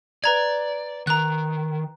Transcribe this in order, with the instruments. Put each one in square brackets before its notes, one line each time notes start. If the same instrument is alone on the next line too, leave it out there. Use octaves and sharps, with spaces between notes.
[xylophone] B4 A#5 G#6 [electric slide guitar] D5
[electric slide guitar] D#3 [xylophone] A#5 F#6